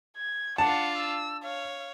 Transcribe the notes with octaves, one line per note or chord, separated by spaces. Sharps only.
G#6
D4 F4 F#5 A5
E6
C#5 F5